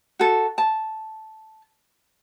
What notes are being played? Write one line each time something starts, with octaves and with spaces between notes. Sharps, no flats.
F#4 A4
A5